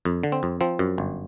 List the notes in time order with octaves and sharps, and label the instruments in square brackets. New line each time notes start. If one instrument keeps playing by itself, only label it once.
[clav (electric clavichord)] F2
D3
C4
F2
F3 C4
F#2
G1